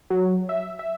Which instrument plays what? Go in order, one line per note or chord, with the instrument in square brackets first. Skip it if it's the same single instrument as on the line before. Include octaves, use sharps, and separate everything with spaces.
[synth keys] F#3
E5
E5